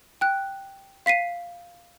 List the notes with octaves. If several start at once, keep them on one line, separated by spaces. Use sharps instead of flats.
G5 F#6
F5 B6 C7 D#7